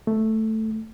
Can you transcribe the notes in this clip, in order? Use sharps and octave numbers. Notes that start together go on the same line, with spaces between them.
A3